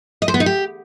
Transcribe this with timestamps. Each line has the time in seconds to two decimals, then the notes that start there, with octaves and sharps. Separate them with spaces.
0.22 D#5
0.28 C5
0.34 B3
0.40 D#4
0.46 G4